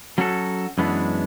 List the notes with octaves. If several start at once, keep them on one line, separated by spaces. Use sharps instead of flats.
F#3 C#4 F#4 A4
F#2 E3 G#3 B3 D4